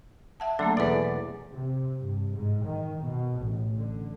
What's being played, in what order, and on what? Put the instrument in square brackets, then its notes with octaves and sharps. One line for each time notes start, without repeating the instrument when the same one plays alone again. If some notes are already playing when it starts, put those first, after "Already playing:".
[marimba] E5 F#5 A5
[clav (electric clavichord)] D3 [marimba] F#3 A3 A#3
[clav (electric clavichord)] E2 D5 [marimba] B2 A4 B4
[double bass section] C3
G2
G#2
D#3
B2
A1
D3